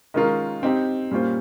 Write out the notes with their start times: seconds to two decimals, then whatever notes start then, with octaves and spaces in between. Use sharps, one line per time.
0.14 D#3 G#3 C#4 F4 A#4
0.63 C4 D#4 G4
1.11 A#2 G3 C#4 F4 C5